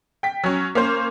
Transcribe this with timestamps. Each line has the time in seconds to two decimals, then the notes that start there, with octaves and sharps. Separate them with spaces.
0.23 G5 B6
0.43 F#3 C#4
0.75 A#3 C#4 C5